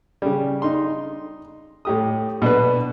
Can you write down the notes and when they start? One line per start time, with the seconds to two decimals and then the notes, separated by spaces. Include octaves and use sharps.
0.22 C#3 G3
0.62 D#4 C6
1.85 A2 G4 D#6
2.42 B2 D4 B4